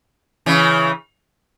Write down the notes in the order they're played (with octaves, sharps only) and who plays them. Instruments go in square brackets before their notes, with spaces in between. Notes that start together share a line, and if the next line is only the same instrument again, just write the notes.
[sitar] C#3 E3